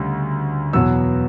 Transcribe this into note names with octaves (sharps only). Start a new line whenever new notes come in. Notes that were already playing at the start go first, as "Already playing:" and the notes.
Already playing: D2 C#3 G3
E2 B2 F#3 B3 E6